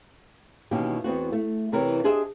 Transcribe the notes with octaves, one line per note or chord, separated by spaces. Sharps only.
B2 D#3 E3 A#3 C#4 G4
E2 B3 C4 F#4
A3
E2 C3 E3 A#4 C#5
D4 G4 G#4 C5 D#5 E5